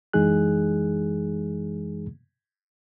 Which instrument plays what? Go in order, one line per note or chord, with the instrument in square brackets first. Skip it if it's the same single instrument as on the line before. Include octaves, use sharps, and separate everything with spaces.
[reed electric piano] F#2 E3 G#3 D#4 G#4 F#6